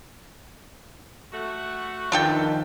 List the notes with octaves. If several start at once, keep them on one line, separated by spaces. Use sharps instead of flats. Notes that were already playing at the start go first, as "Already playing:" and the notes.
A3 F#4
E2 D#3 F3 D4 A4 G5